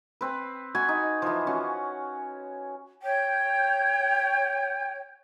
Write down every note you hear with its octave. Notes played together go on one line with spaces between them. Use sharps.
C4 B4
F#4 G#5 B5
D#4
E3 F3
C#4 F#4
C#5 G5 G6